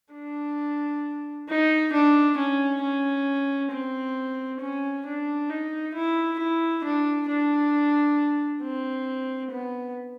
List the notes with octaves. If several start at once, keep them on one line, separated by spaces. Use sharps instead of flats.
D4
D#4
D4
C#4
C#4
C4
C#4
D4
D#4
E4
E4
D4
D4
C4
B3